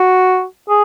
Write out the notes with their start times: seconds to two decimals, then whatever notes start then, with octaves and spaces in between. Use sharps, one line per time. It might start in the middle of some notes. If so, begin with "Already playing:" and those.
Already playing: F#4
0.69 G#4